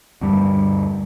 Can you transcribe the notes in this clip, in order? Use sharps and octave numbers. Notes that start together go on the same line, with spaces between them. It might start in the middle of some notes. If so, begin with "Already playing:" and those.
D2 G2 G3